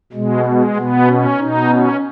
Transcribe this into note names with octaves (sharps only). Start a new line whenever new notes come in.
B2 G#3
G#3
B2 B3
C#4
B2 D#4
C#4